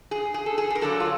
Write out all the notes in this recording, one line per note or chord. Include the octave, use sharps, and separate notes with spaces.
G#4
G#4
A4
G#4
A4
A#4
G2 D3 F#3 A4
F4